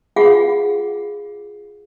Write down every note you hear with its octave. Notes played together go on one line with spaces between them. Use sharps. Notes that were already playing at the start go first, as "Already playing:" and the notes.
F4 G#4 F5 F#5